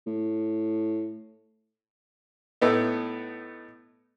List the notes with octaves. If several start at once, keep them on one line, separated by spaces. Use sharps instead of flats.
A2
A2 A3 B3 D#4